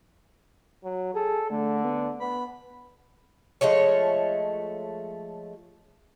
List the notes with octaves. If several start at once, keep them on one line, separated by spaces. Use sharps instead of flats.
F#3
G#4 A4
D3 A3
B3
B3 B5
F3 G#3 A3 C#5